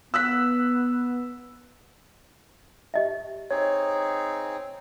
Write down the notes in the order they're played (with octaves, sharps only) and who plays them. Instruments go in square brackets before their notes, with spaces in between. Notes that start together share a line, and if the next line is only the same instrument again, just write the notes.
[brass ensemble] B3 [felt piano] E6 F#6 B6
[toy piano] G4 D#5 E5
[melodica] C4 D#4 G#4 [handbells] C#5